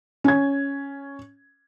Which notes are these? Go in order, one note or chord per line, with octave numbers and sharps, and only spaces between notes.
C#4 G#6